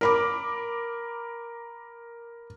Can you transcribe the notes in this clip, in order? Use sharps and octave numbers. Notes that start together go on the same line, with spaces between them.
A#4 B5 D6